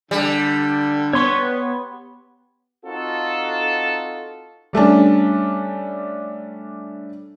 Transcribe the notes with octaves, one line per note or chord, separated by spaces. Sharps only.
D3 G3
B3 C#5 C6 C#6
C4 D#4 F4 F#4 A4
G3 A3 C#4 D4